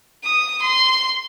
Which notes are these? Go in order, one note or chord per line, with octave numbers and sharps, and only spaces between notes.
D#6
C6